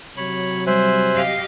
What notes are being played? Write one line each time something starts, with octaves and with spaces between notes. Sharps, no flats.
C3 F#3 C#5 B5
G3 C5 E5 G#5 F#6
G4 D#5 F5